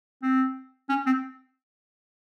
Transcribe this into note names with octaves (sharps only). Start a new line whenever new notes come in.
C4
C#4
C4